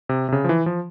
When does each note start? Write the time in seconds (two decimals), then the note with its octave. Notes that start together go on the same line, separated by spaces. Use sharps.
0.09 C3
0.29 C3
0.32 C#3
0.44 F3
0.49 E3
0.66 F3